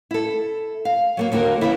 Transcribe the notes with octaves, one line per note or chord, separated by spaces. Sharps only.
E4 A4
F5
F#3 A3 A#3
D#2 D3 A#3 F#4 A#4
C#3 E3 A#3 E4